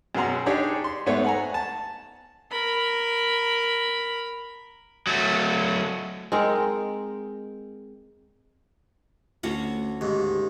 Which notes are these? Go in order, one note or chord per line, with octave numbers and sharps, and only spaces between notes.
F#2 B2 G#4 F#5 A#5 C6
D4 D#4 G4 G#4 C#5
C6
G#2 A3 B3 C#5
F#5 G#5 A#5
A5
A#4 B5
F#3 A3
G#3 C4 D#4 A#4
D2 C#4 F#4
D#2 G#2